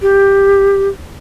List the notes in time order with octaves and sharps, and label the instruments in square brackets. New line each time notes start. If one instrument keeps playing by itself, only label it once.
[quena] G4